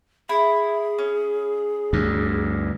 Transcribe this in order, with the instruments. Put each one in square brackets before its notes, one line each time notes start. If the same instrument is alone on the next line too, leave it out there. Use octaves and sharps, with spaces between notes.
[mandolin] E4 [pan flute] G#4
[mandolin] C#4
[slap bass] D2 G2